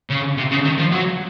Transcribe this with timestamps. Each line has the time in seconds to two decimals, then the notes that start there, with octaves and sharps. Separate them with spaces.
0.10 C#3
0.37 C3
0.51 C#3
0.65 D#3
0.78 F3
0.92 F#3